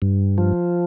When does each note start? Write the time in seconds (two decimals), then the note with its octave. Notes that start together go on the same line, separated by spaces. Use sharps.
0.02 G2
0.38 F3